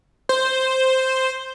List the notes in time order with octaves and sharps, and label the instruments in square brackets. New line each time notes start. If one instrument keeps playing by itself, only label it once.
[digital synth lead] C5